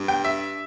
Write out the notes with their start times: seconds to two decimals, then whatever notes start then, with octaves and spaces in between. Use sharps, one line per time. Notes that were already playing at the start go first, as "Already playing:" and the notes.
Already playing: G2
0.08 G5
0.24 E5